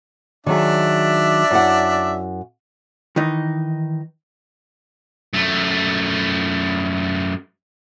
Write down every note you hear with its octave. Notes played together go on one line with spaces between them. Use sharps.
D#3 F#3 D4 G#4 D5 E5
F#2 E4 F#5
D#3 E3 D#4
F#2 A3